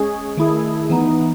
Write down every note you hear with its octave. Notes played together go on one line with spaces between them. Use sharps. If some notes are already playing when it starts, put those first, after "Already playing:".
Already playing: G#3 C#4 G#4
D#3 A3 E4 G#4
E3 B3 D#4